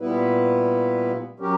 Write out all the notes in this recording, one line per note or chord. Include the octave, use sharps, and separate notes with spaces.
A#2 G3 B3 E4 B4
F#3 C#4 G4 A#4